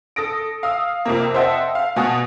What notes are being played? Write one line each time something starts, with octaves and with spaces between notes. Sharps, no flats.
A4 D#6 A#6 D7
F5 D#6 E6
F2 C3 A#3
C5 D#5 E5 F#5 G5 A5
F5
B2 F#4 G#5 A5 D#6